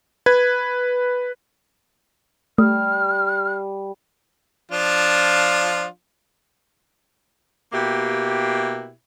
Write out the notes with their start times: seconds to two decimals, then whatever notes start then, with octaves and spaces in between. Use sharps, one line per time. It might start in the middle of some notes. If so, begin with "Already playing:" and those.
0.26 B4 G#6
2.58 G3 A3 F6
4.72 F3 D4 F4
7.73 B2 A#3 E4 G4